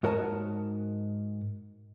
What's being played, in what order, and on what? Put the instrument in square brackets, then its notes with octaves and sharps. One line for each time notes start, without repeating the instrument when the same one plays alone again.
[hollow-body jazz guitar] G#2 F#4 A#4 C#5 D#5 A5